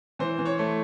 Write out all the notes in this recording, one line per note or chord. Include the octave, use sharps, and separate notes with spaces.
E3 C5
E3
C#5
A3